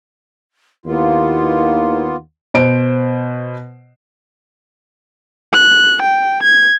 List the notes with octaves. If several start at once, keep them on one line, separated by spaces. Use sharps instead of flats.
D#2 A#3 B3 E4 F4
B2 C5 D7
F#6
G5
G#6